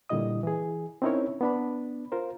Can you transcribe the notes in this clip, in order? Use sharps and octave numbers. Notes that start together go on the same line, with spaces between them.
A#2 D3 G3 E4 D#5 D#6
E3 G#4
C4 C#4 D#4 E4 A#4 C#5
B3 D4 B5
F4 A#4 C5